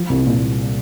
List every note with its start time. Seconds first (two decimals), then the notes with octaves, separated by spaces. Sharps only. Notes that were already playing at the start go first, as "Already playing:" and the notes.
Already playing: F3
0.09 C2
0.26 A#2